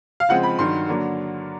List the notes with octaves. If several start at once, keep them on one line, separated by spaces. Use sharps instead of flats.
F5
C#3 F3 G#3 C4 F#5
B5
G2 D#3 F#3 C6
D3 F#3 A#3 D4